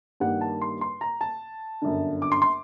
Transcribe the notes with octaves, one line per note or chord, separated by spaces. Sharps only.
G2 D#3 G3 A#3 F#5
A5
C6
C6
A#5
A5
G1 F#2 D3
D6
C6
C6